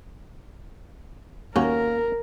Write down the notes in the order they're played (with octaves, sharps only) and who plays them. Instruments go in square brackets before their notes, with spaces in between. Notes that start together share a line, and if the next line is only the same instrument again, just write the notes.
[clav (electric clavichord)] D#2 C#4 F#4 [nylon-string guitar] A#3 [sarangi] A#4